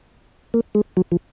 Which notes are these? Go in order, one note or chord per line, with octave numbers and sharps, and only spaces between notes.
A#3
G#3
F#3
F3